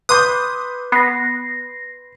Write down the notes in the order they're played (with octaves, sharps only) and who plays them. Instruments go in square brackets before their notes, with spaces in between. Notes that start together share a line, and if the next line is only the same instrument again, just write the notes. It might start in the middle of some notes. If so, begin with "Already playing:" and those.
[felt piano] B4 C6 G6 [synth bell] D6 F#6 [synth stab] D#6
[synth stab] B3 [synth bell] A#6 C7